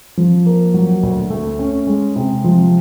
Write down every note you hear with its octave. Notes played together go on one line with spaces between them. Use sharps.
F3
A#3
F#3
D2
A3
C#4
G#3
C3
F3